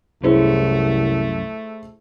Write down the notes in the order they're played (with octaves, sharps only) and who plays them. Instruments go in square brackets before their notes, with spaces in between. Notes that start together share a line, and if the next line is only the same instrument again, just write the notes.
[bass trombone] C2 [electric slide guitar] F#2 C#4 [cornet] A3 [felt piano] E4 G#4 C5